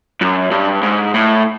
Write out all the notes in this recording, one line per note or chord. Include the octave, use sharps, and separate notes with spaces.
F#2
G2
G#2
A2